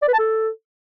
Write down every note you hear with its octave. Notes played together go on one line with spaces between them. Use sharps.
D5
B4
A5
A4